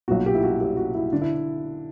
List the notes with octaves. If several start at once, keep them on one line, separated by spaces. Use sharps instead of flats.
B1 A#2 F#4
G4
E4
F#4
G4
F#4
E4
D3 D4
E4